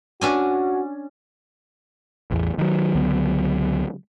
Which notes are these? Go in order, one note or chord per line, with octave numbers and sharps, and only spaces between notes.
C#4 D4 F#4 G#5
A1 E2
D#3 F#3
C#2 D3 F#3 B3